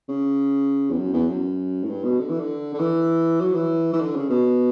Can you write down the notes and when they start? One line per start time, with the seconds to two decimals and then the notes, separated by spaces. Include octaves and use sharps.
0.08 C#3
0.90 E2
0.98 F#2
1.13 E2
1.29 F#2
1.83 A2
1.89 G2
2.03 B2
2.19 D3
2.29 E3
2.39 D3
2.74 D3
2.79 E3
3.40 F#3
3.55 E3
3.93 E3
4.00 D3
4.16 C#3
4.29 B2